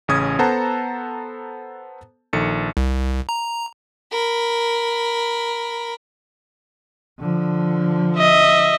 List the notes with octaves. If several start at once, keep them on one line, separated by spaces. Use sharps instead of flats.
A1 C#3 C#4 D#6 G#6
B3 A4 C5 F#5 A5 A#5
A#1 D#3 A4 C#7
C2
A#5
A#4 B5
D3 F3
D#5 E5